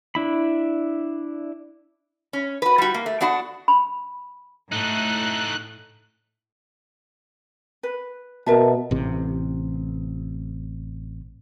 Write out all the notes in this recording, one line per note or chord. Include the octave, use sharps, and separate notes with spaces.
D4 E4 B5
C#4
F#4 B4
G3 F#4
A#3
A3
B3 D4 F#4 F#5
B5
A2 A3 D#4 F#6
B4
B2 A#4 E5 A5
A1 C3